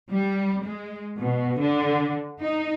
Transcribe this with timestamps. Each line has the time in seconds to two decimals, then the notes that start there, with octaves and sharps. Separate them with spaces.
0.11 G3
0.64 G#3
1.19 B2
1.59 D3
2.40 D#4